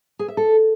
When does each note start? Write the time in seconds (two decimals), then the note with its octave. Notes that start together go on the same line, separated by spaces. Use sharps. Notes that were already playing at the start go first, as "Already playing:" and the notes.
0.19 G#4
0.28 E5
0.37 A4